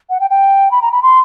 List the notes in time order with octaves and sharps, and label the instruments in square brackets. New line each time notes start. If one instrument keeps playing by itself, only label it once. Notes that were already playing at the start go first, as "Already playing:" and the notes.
[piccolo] F#5
G5
G5
B5
A#5
B5
C6